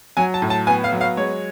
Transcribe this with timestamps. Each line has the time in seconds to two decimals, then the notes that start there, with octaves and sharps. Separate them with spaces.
0.17 F#3 G#5
0.34 A5
0.42 A2
0.50 A5
0.67 B3 G#5
0.84 F5
0.92 F#3
1.01 F5
1.17 G#3 C#5